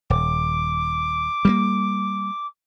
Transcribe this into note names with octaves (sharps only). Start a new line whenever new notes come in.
D#1 D6
G3 G#3 A#3